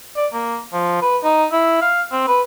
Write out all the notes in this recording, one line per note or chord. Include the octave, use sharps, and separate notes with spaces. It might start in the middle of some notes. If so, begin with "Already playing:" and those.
D5
A#3
F3
B4
D#4
E4
F5
C4
B4